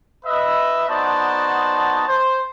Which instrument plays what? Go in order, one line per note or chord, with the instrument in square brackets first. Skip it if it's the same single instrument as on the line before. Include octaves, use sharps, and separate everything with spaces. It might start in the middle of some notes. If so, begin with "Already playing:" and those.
[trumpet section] B4 D#5 E5
B3 D#4 F#4 C5 D5 A5
C5